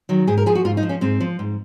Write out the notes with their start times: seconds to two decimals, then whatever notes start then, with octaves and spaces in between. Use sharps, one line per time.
0.09 D#3 F#3
0.27 G#2 G#4
0.37 A#4
0.46 F3 G#4
0.55 F#4
0.65 G#2 F4
0.77 D#4
0.83 F3
0.89 C#4
1.01 G#2 C4
1.20 F3
1.39 G#2